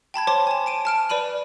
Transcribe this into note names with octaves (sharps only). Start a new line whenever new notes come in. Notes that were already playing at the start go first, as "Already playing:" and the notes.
G5 A5 B5 G#6
C5 C#5 A5 C6 D6
G#5 A5
A5 D7 D#7
A5 F6 D7
B4 D5 B5 D#7 F#7